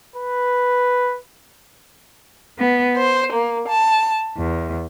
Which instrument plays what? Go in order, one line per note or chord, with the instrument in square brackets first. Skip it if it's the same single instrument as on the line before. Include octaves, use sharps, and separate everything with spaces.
[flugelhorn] B4
[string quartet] B3
C5
A#3
A5
E2